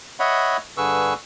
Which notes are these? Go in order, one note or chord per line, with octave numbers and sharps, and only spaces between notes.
C#5 D#5 E5 F#5 B5
G2 D3 G#4 B4 C#6 E6